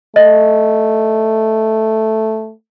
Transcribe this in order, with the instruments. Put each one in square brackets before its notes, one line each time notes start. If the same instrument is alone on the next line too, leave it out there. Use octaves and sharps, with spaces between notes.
[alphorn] A3 [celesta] D#5